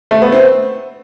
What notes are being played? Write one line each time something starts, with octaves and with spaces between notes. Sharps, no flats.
A3
B3
C4